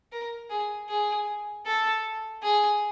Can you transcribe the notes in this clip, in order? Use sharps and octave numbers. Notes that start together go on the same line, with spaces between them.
A#4
G#4
G#4
A4
G#4